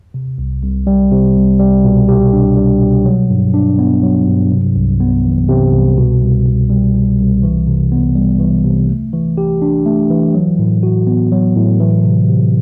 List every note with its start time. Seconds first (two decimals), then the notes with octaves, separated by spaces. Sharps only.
0.14 C3
0.38 C2
0.63 C2
0.87 G3
1.12 C3
1.36 C2
1.59 G3
1.84 B2
2.09 G4
2.33 D4
2.57 G3
2.81 B2
3.06 F#3
3.30 G2
3.54 D4
3.79 B3
4.03 F#3
4.27 G2
4.51 C3
4.76 C2
5.00 B3
5.25 E3
5.49 C3
5.73 C2
5.97 B2
6.22 C2
6.46 C2
6.70 G3
6.94 B2
7.19 C2
7.43 E3
7.67 C3
7.92 B3
8.16 G3
8.40 E3
8.64 C3
8.89 A3
9.13 E3
9.38 G4
9.62 D4
9.86 A3
10.10 E3
10.34 F#3
10.59 A2
10.83 F#4
11.07 B3
11.32 F#3
11.56 A2
11.80 E3
12.05 C3
12.29 C3